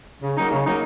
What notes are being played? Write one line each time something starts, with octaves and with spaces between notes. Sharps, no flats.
C#3
F#3 A#3 D#4
C#3
F#3 A#3 D#4